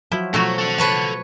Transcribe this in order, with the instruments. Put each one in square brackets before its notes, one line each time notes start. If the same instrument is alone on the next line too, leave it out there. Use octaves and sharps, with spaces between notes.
[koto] F3 E4 [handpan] F#3 F#4
[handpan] B2 F3 [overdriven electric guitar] F#3 [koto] A3 E4 F#4
[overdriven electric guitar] A4 F#5
[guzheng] B4 C#5 A5